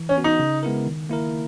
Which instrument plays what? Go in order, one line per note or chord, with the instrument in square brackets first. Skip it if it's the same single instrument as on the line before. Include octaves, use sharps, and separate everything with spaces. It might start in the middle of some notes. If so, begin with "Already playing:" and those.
Already playing: [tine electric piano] E3
[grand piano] C#4
[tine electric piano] B3 F#4
[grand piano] D#4
[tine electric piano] C#3
G#3 B3 E4 A#4
D#3
A#3 E4 A#4